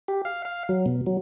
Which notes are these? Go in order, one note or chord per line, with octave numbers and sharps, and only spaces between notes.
G4
F5
F5
F#3
B2
F#3